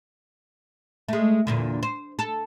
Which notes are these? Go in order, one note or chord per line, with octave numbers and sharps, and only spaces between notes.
G#3 A3
E2 A#2 D3
C5
A4